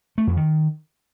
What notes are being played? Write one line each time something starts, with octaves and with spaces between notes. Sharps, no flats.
A3
F2
D#3